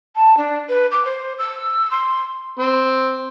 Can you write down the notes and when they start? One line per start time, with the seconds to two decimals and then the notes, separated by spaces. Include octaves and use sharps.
0.15 A5
0.37 D4
0.68 B4
0.91 D6
1.05 C5
1.38 E6
1.91 C6
2.59 C4 C6